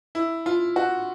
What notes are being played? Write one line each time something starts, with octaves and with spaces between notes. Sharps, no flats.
E4
F4
F#4